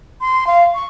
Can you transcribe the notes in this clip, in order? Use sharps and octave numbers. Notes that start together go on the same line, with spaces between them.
C6
F5
C#6